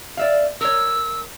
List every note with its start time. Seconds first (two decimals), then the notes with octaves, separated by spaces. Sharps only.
0.17 D5 E5 F5
0.61 A#4 C#5 E6